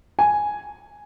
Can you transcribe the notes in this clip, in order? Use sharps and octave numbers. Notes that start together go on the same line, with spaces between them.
G#5